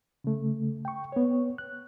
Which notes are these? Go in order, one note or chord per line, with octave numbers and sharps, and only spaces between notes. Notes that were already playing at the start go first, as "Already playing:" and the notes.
C#3 A3
G5 C#6
B3 C#5
F#6